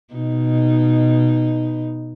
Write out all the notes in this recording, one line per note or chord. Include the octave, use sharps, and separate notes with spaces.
B2 D#4